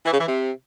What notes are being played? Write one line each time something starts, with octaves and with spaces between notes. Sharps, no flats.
E3
C#3
E3
C3